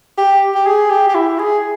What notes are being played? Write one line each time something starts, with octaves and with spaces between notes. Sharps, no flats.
G4
G4
G#4
G4
G4
E4
G#4